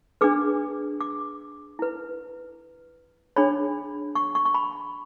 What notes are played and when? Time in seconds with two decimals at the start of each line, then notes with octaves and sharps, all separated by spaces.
0.21 D4 G#4 B4 D6
1.01 D6
1.79 E4 B4
3.36 D4 G#4 C#5 B5
4.15 C#6
4.35 C#6
4.45 C#6
4.54 B5